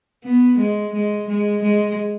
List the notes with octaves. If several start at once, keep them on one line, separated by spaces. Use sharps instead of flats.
B3
G#3
G#3
G#3
G#3